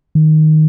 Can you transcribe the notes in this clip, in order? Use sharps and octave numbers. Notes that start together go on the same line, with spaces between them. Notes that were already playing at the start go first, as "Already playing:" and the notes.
D#3